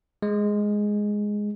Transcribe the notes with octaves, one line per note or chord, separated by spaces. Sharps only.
G#3